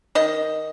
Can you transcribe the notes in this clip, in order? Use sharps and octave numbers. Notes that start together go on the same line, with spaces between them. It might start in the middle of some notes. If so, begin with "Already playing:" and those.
D#3 D#5